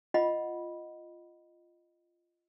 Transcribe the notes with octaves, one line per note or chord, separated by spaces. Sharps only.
F4 D#5 F#5 B5